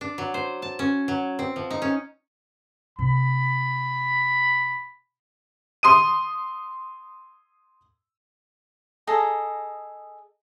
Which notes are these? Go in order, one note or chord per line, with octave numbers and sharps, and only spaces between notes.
D4
F#3
C5
A5
C#4
F#3
C4
F3
D#4
C#4
C3 B5
C6 D#6 D#7
G#4 A4 D#5 A#5